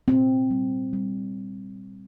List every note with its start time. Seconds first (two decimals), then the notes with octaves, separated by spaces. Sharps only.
0.08 A#2 C4
0.51 G3
0.93 G3